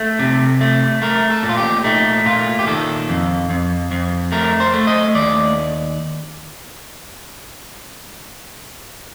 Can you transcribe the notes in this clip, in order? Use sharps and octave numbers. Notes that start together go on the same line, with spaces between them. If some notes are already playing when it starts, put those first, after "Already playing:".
Already playing: A3 A4
C3
A3
A3 A#4
A4
A#2
F4
G4
A3 D#4
A#2 F4
G4
D#3 A4
F2
F2
F2
A3 A#4
C5
A3
D#5
D#2 D5